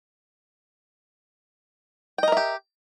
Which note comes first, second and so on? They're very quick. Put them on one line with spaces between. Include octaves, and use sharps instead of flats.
G5 D#5 A#4 E5 G4